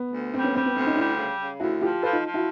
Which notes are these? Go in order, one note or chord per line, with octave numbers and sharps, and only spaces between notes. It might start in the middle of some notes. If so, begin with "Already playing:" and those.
Already playing: B3
D2
G3 C4
B3 C#4
G3 C4
B3
D2 C4
C#4 D#4
G3 D4 E4
C#3
C#3
D2 E4 F#4
F3 F4 G4
F3 A4 B4
D#4 F4
F3
E4 F#4